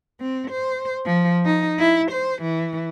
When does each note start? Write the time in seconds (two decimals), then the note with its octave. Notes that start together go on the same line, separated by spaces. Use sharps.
0.20 C4
0.51 C5
1.06 F3
1.45 D#4
1.79 E4
2.11 C5
2.42 E3